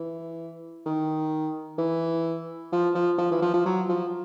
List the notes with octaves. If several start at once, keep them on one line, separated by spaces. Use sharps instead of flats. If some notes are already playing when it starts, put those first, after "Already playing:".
Already playing: E3
D#3
E3
F3
F3
F3
E3
F3
F3
F#3
F3